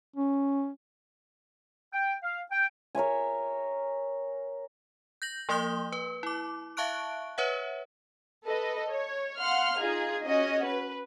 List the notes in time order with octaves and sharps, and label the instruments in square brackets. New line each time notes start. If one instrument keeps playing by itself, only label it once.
[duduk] C#4
[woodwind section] G5
F5
G5
[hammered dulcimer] A#4 C#5 E5 G#5
[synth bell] G6 A#6 F#7
F3 A#3 C6 D#6 G6 G7
B4
E4 D6
E5 F5 A5 C#6 F#6 D7
B4 C#5 E5 F#5
[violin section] A4 B4 D#5
C#5
F5 F#5 C6 F6
D#4 F4 G#4
C#4 F#4 D#5
B4